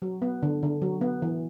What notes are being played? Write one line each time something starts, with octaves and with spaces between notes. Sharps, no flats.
F#3
B3
D3
D3
F#3
B3
E3